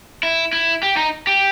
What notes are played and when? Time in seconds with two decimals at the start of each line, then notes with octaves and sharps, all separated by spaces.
0.23 E4
0.53 E4
0.83 G4
0.97 D#4
1.27 G4